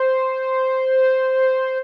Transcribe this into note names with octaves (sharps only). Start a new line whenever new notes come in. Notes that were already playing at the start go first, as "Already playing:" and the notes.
Already playing: C5